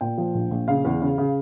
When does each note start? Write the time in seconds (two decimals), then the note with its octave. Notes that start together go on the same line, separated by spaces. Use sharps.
0.01 A#2 G5
0.18 F3
0.34 A#1
0.51 A#1
0.68 C#3 F5
0.85 E2
1.02 C#3
1.18 C#3